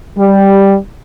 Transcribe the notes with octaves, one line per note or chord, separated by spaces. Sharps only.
G3